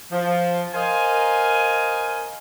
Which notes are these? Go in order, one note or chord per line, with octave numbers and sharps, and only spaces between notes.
F3
A#4 C5 D#5 F5 G#5